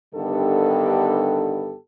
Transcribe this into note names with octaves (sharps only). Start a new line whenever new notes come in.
G2 D3 D#3 B3 G4 A4